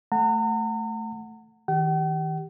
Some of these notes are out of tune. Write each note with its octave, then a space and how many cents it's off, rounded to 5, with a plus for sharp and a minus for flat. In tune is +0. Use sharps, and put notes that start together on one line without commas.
A3 +0 F#5 +0 A#5 -40
D#3 +35 G4 +0 G5 -45